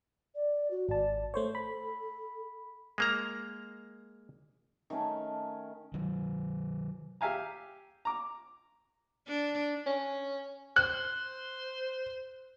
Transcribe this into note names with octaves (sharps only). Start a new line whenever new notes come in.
D5
F#4
G#1 D5 A5
A3 A4 C5 C#5
B5
G#3 A#3 A#5
D#3 A3 C#4 A#4
D#3 F#3
G4 E5 F5 G#5 A#5
A#5 D6
D4
C#4
C5 F#6